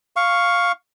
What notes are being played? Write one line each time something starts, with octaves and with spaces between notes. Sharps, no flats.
F5 C#6